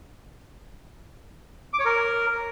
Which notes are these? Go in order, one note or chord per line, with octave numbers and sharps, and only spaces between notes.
D6
C#5
A#4